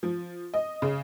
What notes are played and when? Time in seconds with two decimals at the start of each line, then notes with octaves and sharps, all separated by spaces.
0.03 F3
0.54 D#5
0.82 C#3